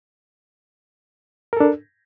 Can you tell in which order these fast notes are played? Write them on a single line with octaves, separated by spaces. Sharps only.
A#4 A4 D4